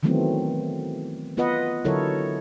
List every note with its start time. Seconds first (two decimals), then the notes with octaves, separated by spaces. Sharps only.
0.03 D#3 E3 F#3 A3 B3 C4
1.37 B3 F4 B4 D#5 F#5
1.84 D3 F#3 E4 A4 A#4 C#5